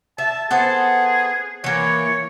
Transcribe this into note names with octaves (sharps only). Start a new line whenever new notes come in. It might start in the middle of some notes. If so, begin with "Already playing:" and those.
E5 A5
B3 G#4 A4 C5
E3 A#3 C#5